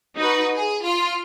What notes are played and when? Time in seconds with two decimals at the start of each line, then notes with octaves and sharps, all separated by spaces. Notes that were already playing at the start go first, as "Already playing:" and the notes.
0.16 D#4 F#4 B4
0.55 G#4
0.84 F4 F6